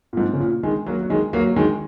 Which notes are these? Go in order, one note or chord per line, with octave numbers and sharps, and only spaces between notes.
A#2
G#2
C#3
A#2
D#3 G#3
F#3 A#3
F#3
D#3 G#3
F#3 A#3
F#3
D#3 G#3